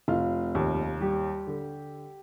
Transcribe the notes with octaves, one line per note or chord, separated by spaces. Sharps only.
F1 F4
D#2
G3 G4
D3